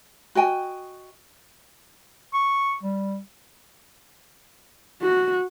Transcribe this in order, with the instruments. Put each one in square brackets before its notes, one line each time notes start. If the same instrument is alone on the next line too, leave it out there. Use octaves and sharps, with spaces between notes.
[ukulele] F#4 D#5 G5 G#5
[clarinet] C#6
G3
[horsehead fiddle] F#4